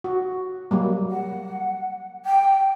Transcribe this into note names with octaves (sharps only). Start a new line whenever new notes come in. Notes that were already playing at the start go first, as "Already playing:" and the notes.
F#4
F#3 G3 A#3
F#5
G5